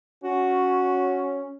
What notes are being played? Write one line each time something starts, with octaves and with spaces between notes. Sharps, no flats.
C#4 F#4